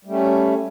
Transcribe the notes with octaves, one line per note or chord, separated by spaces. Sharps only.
G3 A3 C#4